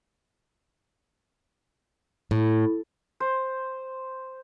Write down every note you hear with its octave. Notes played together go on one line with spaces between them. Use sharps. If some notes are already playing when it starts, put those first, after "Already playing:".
A2
C5